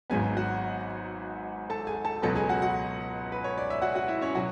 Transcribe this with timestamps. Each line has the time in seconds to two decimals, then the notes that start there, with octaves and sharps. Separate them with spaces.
0.10 G#1 G#2 F#3 B3 G#4 G#5
0.37 F#4 F#5
1.70 A4 A5
1.87 G#4 G#5
2.05 A4 A5
2.22 C#2 B2 F#3 B3 A4 A5
2.35 G#4 G#5
2.49 F#4 F#5
2.62 F#4 F#5
3.32 B4
3.44 C#5
3.58 D5
3.70 E5
3.82 F#4 F#5
3.95 F#4 F#5
4.08 E4 E5
4.21 C#4 C#5
4.35 B2 F#3 F#4 F#5